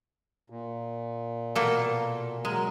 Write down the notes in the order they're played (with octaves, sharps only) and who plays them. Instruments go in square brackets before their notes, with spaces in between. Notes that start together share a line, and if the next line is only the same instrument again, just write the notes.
[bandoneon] A#2
[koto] B2 A#3 A4
[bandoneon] F#3 A#4 [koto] G#3